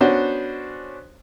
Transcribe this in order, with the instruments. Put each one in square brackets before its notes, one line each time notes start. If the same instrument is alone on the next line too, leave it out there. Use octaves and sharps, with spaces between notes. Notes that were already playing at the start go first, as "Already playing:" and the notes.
[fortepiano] B3 C#4 D4 F#4 C5